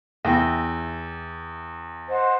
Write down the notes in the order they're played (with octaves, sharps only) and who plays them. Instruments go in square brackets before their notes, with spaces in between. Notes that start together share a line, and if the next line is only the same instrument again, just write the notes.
[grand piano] E2 [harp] E4 G5 A#6
[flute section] C5 D#5 F#5